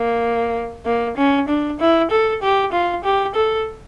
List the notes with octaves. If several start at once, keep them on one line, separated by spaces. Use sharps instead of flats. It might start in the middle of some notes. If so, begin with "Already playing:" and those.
Already playing: A#3
A#3
C#4
D4
E4
A4
G4
F4
G4
A4